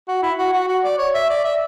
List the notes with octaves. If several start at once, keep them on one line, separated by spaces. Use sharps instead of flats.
F#4
E4
F#4
F#4
F#4
D5
C#5
E5
D5
E5